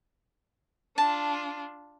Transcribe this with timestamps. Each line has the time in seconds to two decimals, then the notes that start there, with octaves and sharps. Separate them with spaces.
0.98 D4 F4 A5